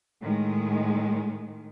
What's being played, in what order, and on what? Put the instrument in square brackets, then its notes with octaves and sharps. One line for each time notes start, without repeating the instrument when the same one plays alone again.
[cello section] A2 D#3 G#3